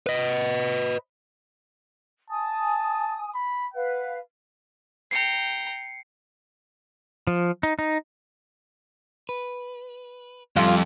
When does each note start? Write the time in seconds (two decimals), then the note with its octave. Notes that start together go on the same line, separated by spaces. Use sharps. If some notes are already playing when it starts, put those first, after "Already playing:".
0.06 B4 D#5
2.30 G#5 A5 D#6
3.35 B5
3.74 B4 F5 F#5
5.11 G5 A#5 C7 C#7
7.27 F3
7.63 D#4
7.79 D#4
9.29 B4
10.56 F2 G3 F4 G4 A4 F5